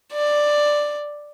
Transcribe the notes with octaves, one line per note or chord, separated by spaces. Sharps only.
D5